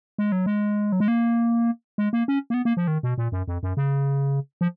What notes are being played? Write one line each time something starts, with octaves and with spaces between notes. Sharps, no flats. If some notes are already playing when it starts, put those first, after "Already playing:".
G#3
F#3
G#3
F#3
G#3
A#3
G#3
A#3
C#4
A#3
B3
A#3
F3
D#3
B2
A#2
F#2
F2
F#2
C#3
F3